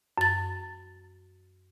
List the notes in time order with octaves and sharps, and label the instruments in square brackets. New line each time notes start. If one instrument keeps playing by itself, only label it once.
[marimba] F#2 A6